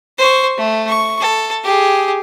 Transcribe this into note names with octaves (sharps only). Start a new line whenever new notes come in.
C5 C#6
A3
C#6
A4
G4 G#4